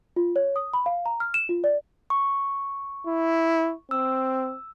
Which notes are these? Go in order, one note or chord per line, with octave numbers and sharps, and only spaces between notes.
F4
C#5
D#6
B5
F5
A#5
F6
E7
F4
D5
C#6
E4
C4 E6